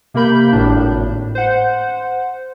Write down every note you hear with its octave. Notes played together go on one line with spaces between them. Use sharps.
C3 A#3 A#4 B5 G6
G#1 A2 D4
C5 F#5